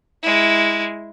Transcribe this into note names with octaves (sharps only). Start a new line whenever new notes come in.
G#3 E4